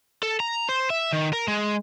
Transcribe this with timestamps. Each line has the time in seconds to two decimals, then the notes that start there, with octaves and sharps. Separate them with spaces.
0.23 A4
0.40 A#5
0.69 C5
0.90 E5
1.13 D#3
1.33 A#4
1.48 G#3